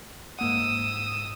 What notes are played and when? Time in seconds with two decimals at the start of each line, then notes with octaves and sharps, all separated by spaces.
0.39 G#2 A#3 F#5 D#6 E6